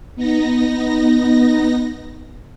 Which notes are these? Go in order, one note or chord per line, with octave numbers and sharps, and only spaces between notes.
B3 D#4 A#6